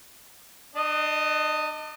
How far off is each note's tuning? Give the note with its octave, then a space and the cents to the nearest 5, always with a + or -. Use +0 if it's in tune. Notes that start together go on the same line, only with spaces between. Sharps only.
D4 +35 D#5 +0